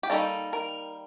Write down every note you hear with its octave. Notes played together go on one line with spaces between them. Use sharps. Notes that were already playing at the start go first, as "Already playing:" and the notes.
G4
D#3 G3 A#3 D#4 A4
A#4